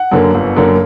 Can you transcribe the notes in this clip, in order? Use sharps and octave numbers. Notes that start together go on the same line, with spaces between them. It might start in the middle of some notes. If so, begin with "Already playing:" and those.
Already playing: F#5
F#2 D3 A#3
G1
F#2 D3 A#3